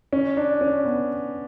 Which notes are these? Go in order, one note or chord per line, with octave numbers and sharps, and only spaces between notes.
C#4
D4
C#4
B3